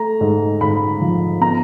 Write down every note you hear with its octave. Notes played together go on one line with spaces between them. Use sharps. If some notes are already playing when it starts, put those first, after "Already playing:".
Already playing: A3 A#5
G#2
G#2 B5
F3
B3 A#5